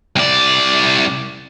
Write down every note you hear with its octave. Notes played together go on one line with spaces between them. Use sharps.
C2 D5